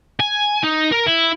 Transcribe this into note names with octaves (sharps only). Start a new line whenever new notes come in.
G#5
D#4
A#4
E4